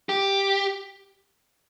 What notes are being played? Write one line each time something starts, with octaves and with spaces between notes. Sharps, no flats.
G4